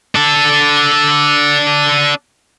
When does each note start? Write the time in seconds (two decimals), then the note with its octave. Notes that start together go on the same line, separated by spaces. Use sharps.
0.15 D4 A4